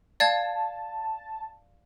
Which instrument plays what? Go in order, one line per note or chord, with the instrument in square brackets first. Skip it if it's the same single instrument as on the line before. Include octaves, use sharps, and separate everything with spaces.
[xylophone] D5 F5 G#6 [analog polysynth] A5